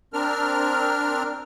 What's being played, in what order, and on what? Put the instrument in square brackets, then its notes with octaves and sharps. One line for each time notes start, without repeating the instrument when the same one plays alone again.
[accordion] C4 D4 A#4 F6